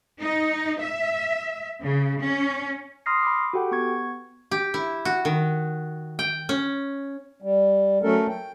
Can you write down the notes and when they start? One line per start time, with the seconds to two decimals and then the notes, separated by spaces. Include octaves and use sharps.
0.21 D#4
0.80 E5
1.82 C#3
2.23 C#4
3.06 B5 C6 D#6 F6 A#6 C7
3.23 B5 D6
3.53 F#4 G4 A4 F#5 G5
3.71 B3 C#6 G#6
4.51 G4
4.74 E4
5.05 F#4
5.25 D#3
6.19 G5
6.49 C#4
7.42 G3
8.02 F#3 A3 C#4 A4 A#4
8.29 G5